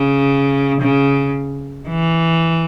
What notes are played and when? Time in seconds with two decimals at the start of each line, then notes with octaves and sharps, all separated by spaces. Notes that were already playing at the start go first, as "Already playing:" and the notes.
Already playing: C#3
0.81 C#3
1.88 E3